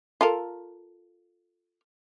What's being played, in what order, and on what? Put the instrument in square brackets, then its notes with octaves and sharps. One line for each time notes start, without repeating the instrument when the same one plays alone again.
[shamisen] F4 A4 A#4